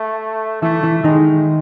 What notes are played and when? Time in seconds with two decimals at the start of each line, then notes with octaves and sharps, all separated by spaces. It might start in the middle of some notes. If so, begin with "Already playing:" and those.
Already playing: A3
0.62 E3 A3 E4
0.83 E3 E4
1.04 D#3 G#3 D#4